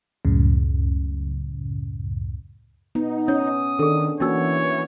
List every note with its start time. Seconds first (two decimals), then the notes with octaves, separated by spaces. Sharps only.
0.25 C#2 F#2 A2 C#3
2.95 B3 D#4
3.28 C#4 C#5 D#6
3.79 D#3 D4 G#4 A4
4.20 E3 A#3 C#4 D#4 F#4 C#5 E6